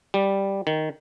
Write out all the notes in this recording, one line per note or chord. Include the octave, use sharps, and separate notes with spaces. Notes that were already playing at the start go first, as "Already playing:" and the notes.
G3
D#3